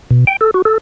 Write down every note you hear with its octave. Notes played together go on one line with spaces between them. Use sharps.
B2
G5
A4
F#4
A4